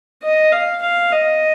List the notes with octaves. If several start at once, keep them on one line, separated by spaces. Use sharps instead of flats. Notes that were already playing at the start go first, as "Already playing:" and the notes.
D#5
F5
F5
D#5